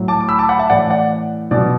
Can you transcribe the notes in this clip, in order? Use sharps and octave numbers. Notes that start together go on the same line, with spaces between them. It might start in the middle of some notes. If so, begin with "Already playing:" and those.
Already playing: A2 F#3
A5 D6
D6
B5 E6
A5 D6
F#5 B5
E5 A5
A2 E3 D5 F#5
D5 F#5
B2 F#3 D5